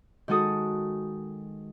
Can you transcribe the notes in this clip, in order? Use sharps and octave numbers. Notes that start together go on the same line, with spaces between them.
D#3 G#3 F#4 A4 D#6